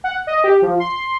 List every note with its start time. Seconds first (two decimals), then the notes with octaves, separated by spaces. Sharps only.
0.04 F#5
0.27 D#5
0.44 G4
0.62 F3
0.80 C6